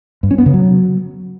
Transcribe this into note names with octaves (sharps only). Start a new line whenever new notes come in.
G2
C#4
B3
C#3
F#3